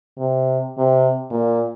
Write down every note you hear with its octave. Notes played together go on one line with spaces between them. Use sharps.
C3
C3
A#2